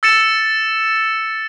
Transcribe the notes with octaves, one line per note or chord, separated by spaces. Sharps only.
E6 A6 C#7 E7